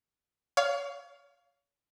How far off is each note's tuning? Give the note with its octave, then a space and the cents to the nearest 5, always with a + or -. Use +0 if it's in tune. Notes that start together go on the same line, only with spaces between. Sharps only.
C#5 +35 F5 +0